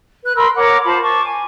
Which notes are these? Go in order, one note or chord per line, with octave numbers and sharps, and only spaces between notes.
B4 F#6
A#4 B5 C6 E6
A#4 C#5 F#5 D6
F4 C5 A5 B5
A5 C#6 D6
G#5